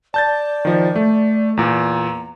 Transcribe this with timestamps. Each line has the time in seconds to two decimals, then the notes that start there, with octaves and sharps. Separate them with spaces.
0.14 D5 A5 G6 A6
0.65 D#3 F3
0.96 A3
1.57 E2 A#2 A#5